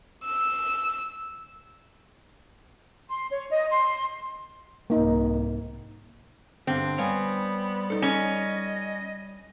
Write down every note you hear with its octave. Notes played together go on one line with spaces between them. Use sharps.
E6
C6
C#5
D#5
C6
C2 G#2 A#3 D#4
G2 D3 C4
G3 B3 C#5 F5 G#5
D#4 A4
C#4 D#5